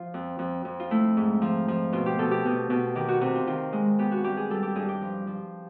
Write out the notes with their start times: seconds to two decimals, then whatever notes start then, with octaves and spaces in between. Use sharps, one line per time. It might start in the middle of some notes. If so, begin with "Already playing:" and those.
Already playing: F3 F4
0.14 F2
0.39 F2
0.65 F2
0.80 F4
0.91 A3 E4
1.17 G#2
1.42 F3
1.68 F3
1.93 B2 F4
2.06 G4
2.18 B2 A4
2.31 G4
2.45 B2
2.70 B2
2.95 D#3 G4
3.08 F#4
3.21 C3 F#4
3.35 F4
3.47 D#3 F4
3.73 G#3
3.99 B3 G4
4.11 F#4
4.24 G2 G4
4.37 G#4
4.50 G3 A4
4.63 G4
4.76 G2 G#4
4.89 G4
5.01 F3
5.27 F3